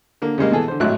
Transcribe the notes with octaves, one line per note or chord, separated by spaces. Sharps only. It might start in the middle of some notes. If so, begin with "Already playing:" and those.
D3 A#3
C#3 G3 G#3 A#3
B2 E3 G#4 A4
D3 C5
G#1 A2 F#3 E4 F#6